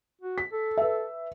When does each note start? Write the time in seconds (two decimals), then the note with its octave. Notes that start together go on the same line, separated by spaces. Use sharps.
0.21 F#4
0.38 B6
0.53 A4
0.78 B4 E5